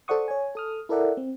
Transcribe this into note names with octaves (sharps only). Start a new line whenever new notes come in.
A4 C5 D5 F#5 C#6 D#6
C#5 G#5
A4 D#6 F6
E4 A4 A#4 D5 E5 F#5
C4